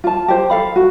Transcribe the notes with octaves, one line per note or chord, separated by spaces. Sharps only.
F4 A5
G4 C5
A4 F5 B5
F#4